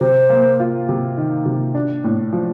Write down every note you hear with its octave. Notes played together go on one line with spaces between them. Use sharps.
C3 C5
A#3
F4
C3
D#3
C3
D4
A2
F3